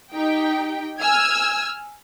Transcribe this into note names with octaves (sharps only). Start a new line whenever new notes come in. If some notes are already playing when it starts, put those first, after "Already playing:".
D#4 G4 G5
G#5 E6 F6 G#6